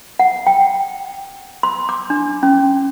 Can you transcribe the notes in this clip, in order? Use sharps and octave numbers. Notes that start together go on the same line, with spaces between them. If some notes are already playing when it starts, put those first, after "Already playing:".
F#5
G5
C6
D6
D4
C#4